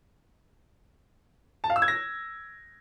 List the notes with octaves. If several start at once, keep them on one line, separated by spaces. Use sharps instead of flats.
A5
F5
E6
G#6
A#6